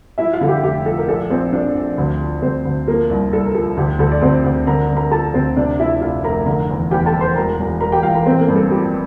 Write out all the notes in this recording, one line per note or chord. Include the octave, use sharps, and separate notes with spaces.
F3 E4 E5
F4 F5
D3 A4
G4
F1 G4
F3 A4
A#4
A#1 A4
A#1 C4 C5
A#1 D4 D5
A#1
D2
F3
D2 C4 C5
D2
F3 A#3 A#4
C2
C2 A4
A#4
F3 A4
D2 G4
D2 A4
D5
D2 C4 C5
D2
D3 A#4 A#5
D3
A#4 A#5
F3 A4 A5
D2 C4 C5
C3 D4 D5
F3 E4 E5
F1 F4 F5
F1 A#4 A#5
D3 A#4 A#5
E2
E2 G4 G5
A4 A5
E2
C5 C6
E1 A#4 A#5
E1
E1 A#4 A#5
G4 G5
E1 F4 F5
A#4 A#5
A1 C4 C5
A#3 A#4
G2
A4
F3 G4